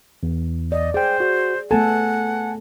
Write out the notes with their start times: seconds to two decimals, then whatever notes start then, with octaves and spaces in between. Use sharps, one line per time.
0.23 E2
0.72 D5 D#5
0.94 G#4 C5 D5 G5
1.20 F#4
1.71 A3 B3 A4 F#5 G#5 A5